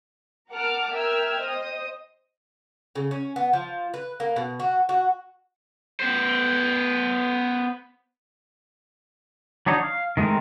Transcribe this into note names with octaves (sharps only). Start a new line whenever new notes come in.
A#4 F#5 A5 D6 F6
A#4 E5 G5 E6 F6 G#6
C5 D#5 D#6
C#3
C#4
B3
F3
B4
A#3
B2
F#4
F#4
B3 C5
F#3 D4 D#4 C#5
F5
D#3 G#3 A3 C4 A#4